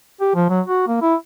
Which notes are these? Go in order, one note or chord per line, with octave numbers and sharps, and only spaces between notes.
G4
F3
F#3
F#4
A#3
E4